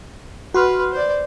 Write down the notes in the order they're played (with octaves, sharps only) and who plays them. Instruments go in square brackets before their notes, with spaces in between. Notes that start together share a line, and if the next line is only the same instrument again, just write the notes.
[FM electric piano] F#4 C6 F6 [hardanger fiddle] B4
[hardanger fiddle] C5 D5